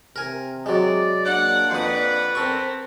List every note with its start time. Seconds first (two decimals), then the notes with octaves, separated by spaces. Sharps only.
0.16 C3 A#4 G#5
0.66 F#3 G#3 D5
1.25 A#3 D4 D5 F#5 F#6
1.71 F2 B4 D#6
2.35 C4 A4 A#4 C#6